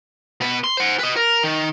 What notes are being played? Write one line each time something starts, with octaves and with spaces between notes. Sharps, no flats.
B2 B4
C6
C5 F#5
B4 D#5
A#4
D#3